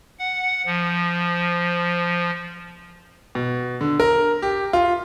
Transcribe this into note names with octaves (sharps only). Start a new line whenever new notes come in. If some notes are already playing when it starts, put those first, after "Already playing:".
F#5
F3
B2
D3
A#4
G4
F4